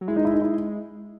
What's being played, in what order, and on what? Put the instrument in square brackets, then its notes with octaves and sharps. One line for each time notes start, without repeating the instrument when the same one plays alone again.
[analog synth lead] F#3
[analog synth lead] G#3 [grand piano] E4
[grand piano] D#4
E4
D#4
E4